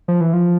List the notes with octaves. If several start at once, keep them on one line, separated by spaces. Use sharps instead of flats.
F3
E3
F3